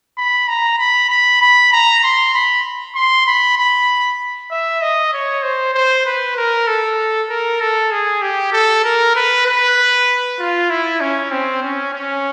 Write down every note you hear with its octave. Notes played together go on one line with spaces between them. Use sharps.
B5
A#5
B5
B5
B5
A#5
C6
B5
C6
B5
B5
E5
D#5
C#5
C5
C5
B4
A#4
A4
A#4
A4
G#4
G4
A4
A#4
B4
B4
F4
E4
C#4
C4
C#4
C#4